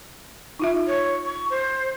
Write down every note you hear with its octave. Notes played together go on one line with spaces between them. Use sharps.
D#4 F4 E5
C#5
C#6
C5